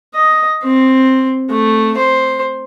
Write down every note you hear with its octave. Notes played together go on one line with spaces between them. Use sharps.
D#5
C4
A3
C5